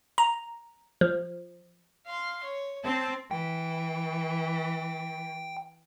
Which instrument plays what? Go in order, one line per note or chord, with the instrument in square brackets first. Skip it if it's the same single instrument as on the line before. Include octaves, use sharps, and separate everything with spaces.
[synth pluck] A#5
F3
[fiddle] F5 C6
C#5
[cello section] C4 [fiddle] A5
[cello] E3 [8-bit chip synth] G5